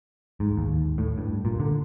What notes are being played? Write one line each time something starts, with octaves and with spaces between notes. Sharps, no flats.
G#2
D#2
A2
G2
A#2
D3